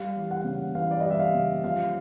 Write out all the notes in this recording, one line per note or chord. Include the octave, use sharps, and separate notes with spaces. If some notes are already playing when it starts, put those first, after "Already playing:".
Already playing: G3 F5
E3
F#5
C#3
E3 F5
D5
G3 D#5
E5
F5
C#3
F3 F5